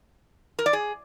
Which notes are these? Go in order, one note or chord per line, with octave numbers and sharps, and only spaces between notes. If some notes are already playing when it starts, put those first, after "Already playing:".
A#4
D5
G#4